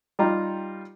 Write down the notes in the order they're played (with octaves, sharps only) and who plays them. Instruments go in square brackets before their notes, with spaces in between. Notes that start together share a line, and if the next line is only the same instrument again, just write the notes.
[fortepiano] G3 D#4 F4 G4 A#5